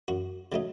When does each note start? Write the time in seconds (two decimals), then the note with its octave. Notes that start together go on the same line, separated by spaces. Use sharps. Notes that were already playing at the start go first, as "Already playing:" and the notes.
0.08 F#2 F#4
0.52 C#3 F#3 A3 D#4